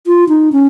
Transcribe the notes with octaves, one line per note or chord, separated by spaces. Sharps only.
F4
D#4
C#4